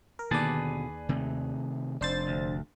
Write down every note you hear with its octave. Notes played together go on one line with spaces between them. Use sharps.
A#4
D#2 B2 D3 G#4 B4 D5 A5
C3 D#3 A3
F1 D4 C5 A6
D2